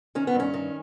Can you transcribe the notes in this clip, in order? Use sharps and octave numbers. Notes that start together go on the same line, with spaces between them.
D#3 C#4
B3
G2
C#4
D#3